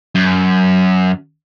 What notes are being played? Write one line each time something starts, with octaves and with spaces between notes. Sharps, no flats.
F#2